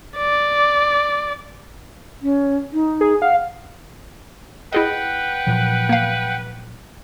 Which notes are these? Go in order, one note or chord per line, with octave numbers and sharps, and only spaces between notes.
D5
C#4
D#4
G#4
F5 F#5
E4 G#4 B4 D#5 F#5 G5
A#2 F3 F#3
A#3 F5